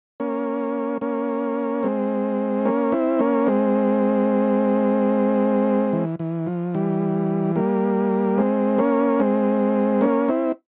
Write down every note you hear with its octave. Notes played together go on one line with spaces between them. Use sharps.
A#3 C#4
A#3 C#4
G#3 C4
A#3 C#4
C4 E4
A#3 C#4
G#3 C4
E3
E3
F3
E3 G3
G3 A#3
G#3 C4
A#3 C#4
G#3 C4
A#3 C#4
C4 E4